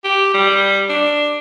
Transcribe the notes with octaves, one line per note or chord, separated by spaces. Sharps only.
G4
G3
D4